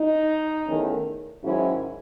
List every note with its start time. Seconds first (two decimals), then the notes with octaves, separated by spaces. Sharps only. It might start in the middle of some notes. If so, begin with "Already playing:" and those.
Already playing: D#4
0.66 E2 D#3 A3 C#4
1.43 G#2 D#3 F#3 C#4 E4